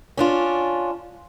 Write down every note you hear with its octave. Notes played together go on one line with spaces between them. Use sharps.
C#4 D4 F4